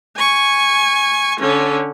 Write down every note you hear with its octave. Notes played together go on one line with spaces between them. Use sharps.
G#5 C#6
D3 C#4